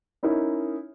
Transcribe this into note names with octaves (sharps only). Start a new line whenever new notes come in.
C#4 D#4 E4 A#4